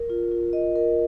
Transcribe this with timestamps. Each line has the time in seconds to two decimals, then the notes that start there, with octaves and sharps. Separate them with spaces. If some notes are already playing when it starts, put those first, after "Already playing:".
Already playing: A#4
0.10 F4
0.32 F4
0.53 D#5
0.75 A#4